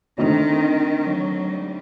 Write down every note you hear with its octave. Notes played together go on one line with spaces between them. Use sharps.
D3 D#3 A3 C4 D#4
F#3
G3